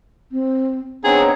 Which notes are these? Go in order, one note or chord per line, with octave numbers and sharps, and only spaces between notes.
C4
B3 C4 D4 D#4 G#4 C#5 A#5